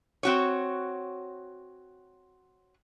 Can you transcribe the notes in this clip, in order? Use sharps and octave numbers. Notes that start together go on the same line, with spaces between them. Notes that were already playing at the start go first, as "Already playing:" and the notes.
C4 F#4 C#5